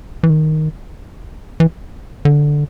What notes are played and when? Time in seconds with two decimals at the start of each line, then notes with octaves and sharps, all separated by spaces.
0.23 E3
0.30 D#3
1.60 E3
2.25 D3